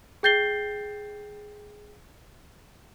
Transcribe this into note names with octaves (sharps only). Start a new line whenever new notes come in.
G#4 G5 G6 A6 C7 G7